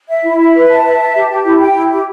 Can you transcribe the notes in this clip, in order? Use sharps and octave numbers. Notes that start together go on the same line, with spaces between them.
E5
E4
E5
B4
A5
E5
A5
G4
G4
E4
G5
E4
G4